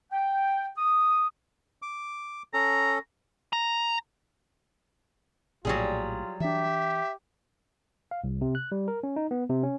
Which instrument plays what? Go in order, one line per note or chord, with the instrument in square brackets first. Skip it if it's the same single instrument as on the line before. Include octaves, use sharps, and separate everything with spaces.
[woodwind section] G5
D#6
[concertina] D6
[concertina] C#4 A4 [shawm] A#5
[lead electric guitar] A#5
[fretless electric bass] A#1 A2 [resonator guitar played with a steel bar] F#3 G3 G#4 [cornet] F4
[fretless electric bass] E3 D4 [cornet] G4 [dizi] E5
[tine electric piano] F5
C2
C3
F#6
G3
A#4
C#4
D#4
B3
C3
C#4